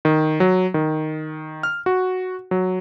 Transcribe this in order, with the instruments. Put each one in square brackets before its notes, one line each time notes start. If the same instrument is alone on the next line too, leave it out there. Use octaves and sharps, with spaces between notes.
[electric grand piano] D#3
F#3
D#3
F6
F#4
F#3